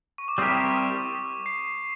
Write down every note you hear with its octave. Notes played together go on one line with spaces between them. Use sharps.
C#6
D6
G3 C4 E4 G4 A#4 D#6
D#6
C7